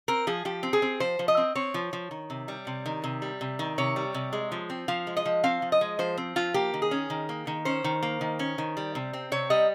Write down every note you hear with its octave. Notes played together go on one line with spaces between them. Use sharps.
C4 A#4
F3 G#4
F3 G4
C4
G#4
C4
F3 C5
F3
D#5
C4
C4 C#5
F3
F3
D#3
C3
G3
C3
D#3
C3
G3
C3
D#3
C3 C#5
G3
C3
G#3
F3
C4
F3 F5
G#3
D#5
F3
C4 F5
F3
D#5
G#3
F3 C5
C4
F3 F4
A#3 G4
D#3
G#4
C#4
D#3
A#3
D#3
C#4 C5
D#3
A#3
D#3
C#4
D#3
G3
C3
C4
C3 C#5
G3 D#5